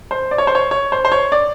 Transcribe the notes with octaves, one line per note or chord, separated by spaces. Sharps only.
C5
D5
C#5
C5
C#5
C#5
C5
C5
C#5
D5